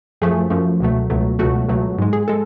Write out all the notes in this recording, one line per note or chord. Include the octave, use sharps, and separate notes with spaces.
F#2 F3 A3 G#4
F#2 F3 A3
C#2 B2 F#3 A3
C#2 B2 F#3 A3
C#2 B2 F#3 A3 F#4
C#2 B2 F#3 A3
G#2 G#3
G#4
G#3 A4